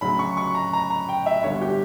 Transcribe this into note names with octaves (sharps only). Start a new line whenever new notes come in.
D2 C#3 F#3 B5
C#6
C#6
A#5
A#5
A#5
G5
E5
G1 G2 D3 C#5
G4